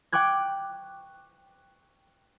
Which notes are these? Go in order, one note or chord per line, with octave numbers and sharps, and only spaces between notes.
G5 C#6 D6 F#6 G#6